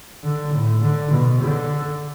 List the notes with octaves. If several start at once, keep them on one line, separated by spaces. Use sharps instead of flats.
D3
A2
D3
B2
D3